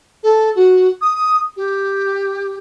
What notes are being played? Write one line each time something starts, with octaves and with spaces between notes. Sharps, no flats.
A4
F#4
D#6
G4